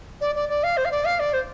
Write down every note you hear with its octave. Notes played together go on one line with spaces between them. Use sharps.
D5
D5
D5
F5
C5
F5
D5
F5
D5
C5